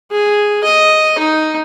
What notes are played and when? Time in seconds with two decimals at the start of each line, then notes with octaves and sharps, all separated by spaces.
0.11 G#4
0.64 D#5
1.19 D#4